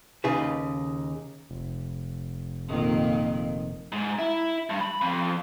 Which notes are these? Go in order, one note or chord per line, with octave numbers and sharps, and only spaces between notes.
D#2 C#3 D#4 G#4 B4
F1
F2 A#2 D#3
G#2
E4
G2
B5
F2